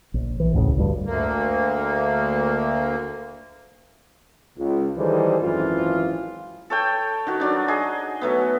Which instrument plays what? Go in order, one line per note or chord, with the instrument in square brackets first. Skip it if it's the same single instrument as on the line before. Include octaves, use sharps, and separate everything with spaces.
[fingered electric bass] A#1
E3
A1 D2 A2 C#3
D2 G2
[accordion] D2 A#3
[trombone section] C#2
D#3 E3 G3 G#4 A4 C5
G#1 F#2 E3 F3 F4
[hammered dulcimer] A4 C#5 G5
D#3 F#4
F#3 D4 D#4
G#4 D#5
F#3 A3 B3